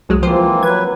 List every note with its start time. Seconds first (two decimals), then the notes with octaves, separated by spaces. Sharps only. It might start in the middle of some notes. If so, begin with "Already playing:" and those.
0.09 C2 F#3 G#3
0.23 E3 F3 A#3 C4 F4 C5
0.63 F#3 B4 G#6